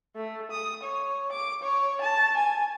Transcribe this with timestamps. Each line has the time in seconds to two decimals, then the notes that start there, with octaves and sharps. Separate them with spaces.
0.16 A3
0.51 D#6
0.83 C#5
1.32 D6
1.63 C#5
2.01 A5
2.36 G#5